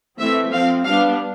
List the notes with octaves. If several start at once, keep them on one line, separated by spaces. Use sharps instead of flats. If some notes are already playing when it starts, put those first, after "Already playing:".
E3 A3 C4 E5
F3 C4 F5
G3 B3 D4 F5